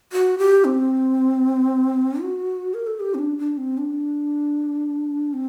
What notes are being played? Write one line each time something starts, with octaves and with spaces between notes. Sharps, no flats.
F#4
G4
C4
F#4
A#4
A4
G4
C4
D4
D4
C4
D4
C4